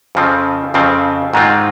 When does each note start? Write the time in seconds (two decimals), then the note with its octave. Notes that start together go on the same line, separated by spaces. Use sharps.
0.15 F2 C#3 F3 C4
0.74 F2 C#3 F3 C4
1.33 G#2 D#3 G#3 C4 F4